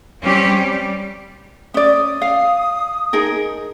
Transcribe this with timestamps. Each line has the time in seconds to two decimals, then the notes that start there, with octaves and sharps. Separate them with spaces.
0.21 G3 C4 C#4 G4
0.52 G3
1.74 C#4 D5 D#6
2.22 F5
3.13 D#4 G#4 A#4